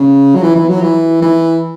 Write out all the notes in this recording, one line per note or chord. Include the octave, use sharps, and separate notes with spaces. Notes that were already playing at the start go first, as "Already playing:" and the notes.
Already playing: C#3
F#3
E3
E3
F#3
E3
E3